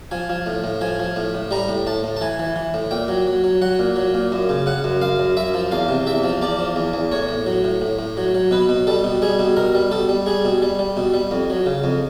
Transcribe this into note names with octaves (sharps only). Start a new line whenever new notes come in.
F3 G#5
F3
A2
A2
F3 G#5
F3
A2
A2
G3 A#5
A2
A2 A5
A2
A5
E3 G#5
E3
E3
A2
A#2 G5
F#3
F#3
F#3
F#3 F#5
A#2
F#3
A#2
F#2
C#3
C#3 F#5
F#2
F#2 F5
F#2
F#2 E5
F3
E2 F5
C3
E2 E5
F3
E2 D5
F3
E2
E2
A2 C#5
A2
F#3
A2
A2
A2
F#3
F#3
B2 B4
B2
G3 A4
B2
G3 G#4
B2
B2 A#4
G3
B2 A4
G3
G3 G#4
B2
G3
G3
B2
G3
F2
F#3
C#3
F2